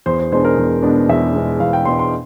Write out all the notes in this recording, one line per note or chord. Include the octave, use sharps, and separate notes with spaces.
E2 C5
C5
B2 G#3 B3 D4 C5
A#4
E2
B2 G#3 B3 D4
E2 E5
B2 G#3 B3 D4
E2 F5
G5
B2 G#3 B3 D4 C6
C6